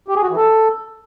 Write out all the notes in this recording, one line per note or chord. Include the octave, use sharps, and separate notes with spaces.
G4
G#4
F#4
E3
A4